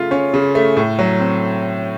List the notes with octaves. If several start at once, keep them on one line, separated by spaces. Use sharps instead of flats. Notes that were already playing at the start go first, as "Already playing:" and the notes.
Already playing: C#3 A3 F4
C#4
C#3
A3
A2
F#3
C4